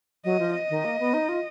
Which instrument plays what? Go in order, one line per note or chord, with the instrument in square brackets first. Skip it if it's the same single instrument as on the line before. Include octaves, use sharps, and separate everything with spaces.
[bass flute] F#3 [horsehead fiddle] D#5
[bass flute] F3
[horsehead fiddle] D#5
[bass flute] D#3
A#3
B3
D#4
F4